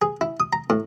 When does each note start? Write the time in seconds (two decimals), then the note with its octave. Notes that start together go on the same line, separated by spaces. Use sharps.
0.02 G#4
0.21 E4
0.40 D#6
0.53 A#5
0.70 A2